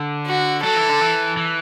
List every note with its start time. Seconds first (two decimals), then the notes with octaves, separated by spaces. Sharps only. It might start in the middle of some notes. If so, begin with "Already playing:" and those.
Already playing: D3
0.26 F#4
0.63 F#3 A4
0.76 E3
0.89 D3
1.02 E3
1.37 E3